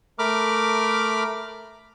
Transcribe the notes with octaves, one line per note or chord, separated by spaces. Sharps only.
A3 A#4 B5 D6 F6